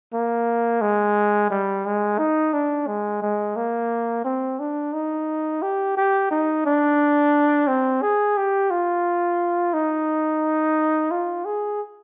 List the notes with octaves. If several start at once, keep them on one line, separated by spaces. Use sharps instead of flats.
A#3
G#3
G3
G#3
D#4
D4
G#3
G#3
A#3
C4
D4
D#4
G4
G4
D#4
D4
C4
G#4
G4
F4
D#4
F4
G#4